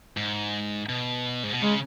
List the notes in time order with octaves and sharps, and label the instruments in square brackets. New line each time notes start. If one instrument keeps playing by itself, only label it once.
[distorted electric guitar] G#2
B2
G#2
B2
[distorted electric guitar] C#3 [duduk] G#3